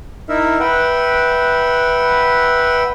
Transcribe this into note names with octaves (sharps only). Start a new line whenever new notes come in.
D#4 E4 A#4 E5
B4 E5 F#5 G5